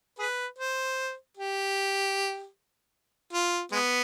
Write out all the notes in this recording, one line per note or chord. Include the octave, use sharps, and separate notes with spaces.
G#4 B4
C5
G4
F4
G#3 B3